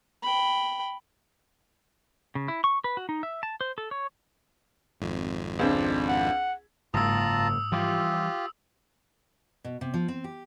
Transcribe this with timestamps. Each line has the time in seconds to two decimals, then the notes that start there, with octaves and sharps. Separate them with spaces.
0.22 G5 B5
2.35 C#3
2.48 E4
2.64 C#6
2.84 B4
2.97 F#4
3.09 D#4
3.23 E5
3.43 A5
3.61 C5
3.78 A4
3.91 C#5
5.01 G#1 F2
5.59 C#2 C4 D4
6.09 F#5
6.94 F#1 G#2 A#3 F4 A5 A#5 D#6 E6
7.72 E3 F3 G3 F4 G4
9.64 B2
9.81 C3
9.94 F3
10.08 C4
10.24 G4